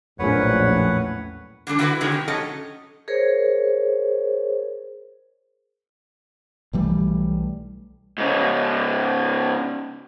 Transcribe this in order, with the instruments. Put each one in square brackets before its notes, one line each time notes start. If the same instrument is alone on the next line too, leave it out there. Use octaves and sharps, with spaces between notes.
[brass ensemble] A#1 [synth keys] E2 F#3 C#4 [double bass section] A2 [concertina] B4 C#5 F#5
[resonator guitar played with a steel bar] D3 G3 D4 A4
D3 E4 F#4 A#4 B4 F#5
B2 D3 D#3 G#3 C4 C#4
G4
F#3 C#4 A4 D#5
[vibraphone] G#4 A#4 C5 C#5
[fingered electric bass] B1 E3 G3 A3
[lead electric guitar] G#2 C#3